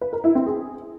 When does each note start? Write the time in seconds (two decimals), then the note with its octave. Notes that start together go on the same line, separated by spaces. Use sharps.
0.01 B4
0.13 A#4
0.24 E4
0.35 C4
0.46 G#4